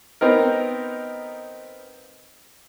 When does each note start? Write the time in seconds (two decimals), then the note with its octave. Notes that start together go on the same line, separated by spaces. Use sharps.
0.21 B3 C4 D#4 A#4